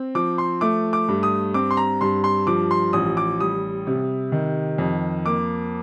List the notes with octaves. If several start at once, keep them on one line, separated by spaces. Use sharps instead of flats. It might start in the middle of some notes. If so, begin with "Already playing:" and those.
Already playing: C4
F3 D6
C6
A3 D6
D6
G2
D#6
C4 D6
C6
A#5
G2 C6
C6
F3 D6
C6
A1 D#6
D6
G3 D#6
C3
D#3
F2
A#3 D6